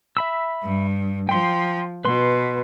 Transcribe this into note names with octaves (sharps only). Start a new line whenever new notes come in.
E5 B5 E6
G2
F3 G5 C6
B2 B4 C6